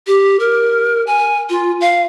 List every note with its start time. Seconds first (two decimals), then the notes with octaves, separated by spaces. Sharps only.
0.07 G4
0.40 A#4
1.07 G#5
1.50 F4
1.81 F5